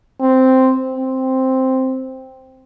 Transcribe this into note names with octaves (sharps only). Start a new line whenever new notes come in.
C4
C4